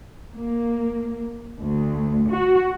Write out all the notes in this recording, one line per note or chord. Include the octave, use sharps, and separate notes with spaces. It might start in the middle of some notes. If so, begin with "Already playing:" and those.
A#3
D2
F#4